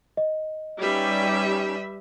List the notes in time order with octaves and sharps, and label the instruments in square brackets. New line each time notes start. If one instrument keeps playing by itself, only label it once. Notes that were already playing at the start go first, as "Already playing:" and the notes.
[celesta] D#5
[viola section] G3 [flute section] C#4 D#4 G4 [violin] B4 E5